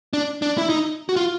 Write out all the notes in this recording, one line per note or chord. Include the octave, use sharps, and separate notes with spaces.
D4
D4
E4
D#4
F#4
F4